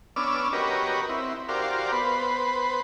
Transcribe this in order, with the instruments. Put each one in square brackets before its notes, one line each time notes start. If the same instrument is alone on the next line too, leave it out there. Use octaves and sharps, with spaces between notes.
[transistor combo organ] B3 C#4 D4 D6 E6 F6
F#4 G4 A#4 B4 C#5 D#5
C4 E4
F#4 G4 A#4 C5 D5 F5
B3 B4 C5